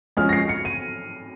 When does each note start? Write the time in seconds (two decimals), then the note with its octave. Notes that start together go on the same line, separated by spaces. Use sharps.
0.17 F3 G#3 C#4 G#4 F6
0.29 A#6
0.33 C7
0.49 C#7
0.65 D#7